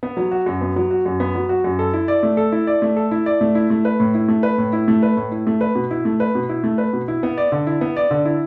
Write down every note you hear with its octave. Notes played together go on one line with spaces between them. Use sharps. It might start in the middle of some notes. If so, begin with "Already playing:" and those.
B3
F#3
F#4
F#2
B3
F#3
F#4
F#2
B3
F#3
F#4
F#2
A4
E4
D5
A3
A4
E4
D5
A3
A4
E4
D5
A3
E4
A3
B4
A2
E4
A3
B4
A2
E4
A3
B4
A2
E4
A3
B4
B2
E4
A3
B4
B2
E4
A3
B4
B2
E4
B3
D5
D3
E4
B3
D5
D3
E4